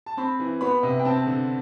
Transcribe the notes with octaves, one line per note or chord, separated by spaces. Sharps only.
A5
C4 B5
E3
B3 B5
C3
G5
C4 A5
D3